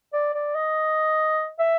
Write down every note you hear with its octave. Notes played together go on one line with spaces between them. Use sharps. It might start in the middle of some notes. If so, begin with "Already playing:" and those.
D5
D5
D#5
E5